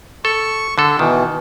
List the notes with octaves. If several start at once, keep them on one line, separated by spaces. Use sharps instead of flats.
A4 C#6
D3 A4
B2 D#3 E3